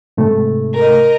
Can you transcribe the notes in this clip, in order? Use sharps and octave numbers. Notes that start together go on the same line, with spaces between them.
G#2 C3 A3
A#4 D#5